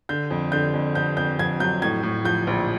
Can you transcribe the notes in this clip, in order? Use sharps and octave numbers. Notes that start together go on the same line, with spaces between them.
D3 G6
F2
D3 G6
F2
F2 G6
F2 G6
F2 G#6
F#3 G6
A2 G#6
A2
F3 G6
A#1